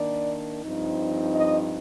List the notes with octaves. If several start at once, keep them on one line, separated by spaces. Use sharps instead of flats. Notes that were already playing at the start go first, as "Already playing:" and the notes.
Already playing: D#3 A#3 D4 D5
G2 F3 C4 D#4
D#5